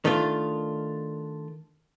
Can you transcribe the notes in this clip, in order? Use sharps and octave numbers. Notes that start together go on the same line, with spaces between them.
D#3 A3 D4 F4